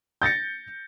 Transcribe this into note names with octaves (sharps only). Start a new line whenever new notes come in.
G6 A6 A#6 C#7